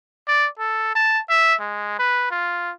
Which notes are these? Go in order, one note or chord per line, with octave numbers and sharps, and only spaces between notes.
D5
A4
A5
E5
G#3
B4
F4